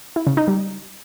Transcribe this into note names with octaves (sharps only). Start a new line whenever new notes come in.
E4
C#3
D#4
G3